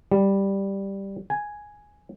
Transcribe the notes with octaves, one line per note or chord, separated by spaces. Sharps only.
G3
G#5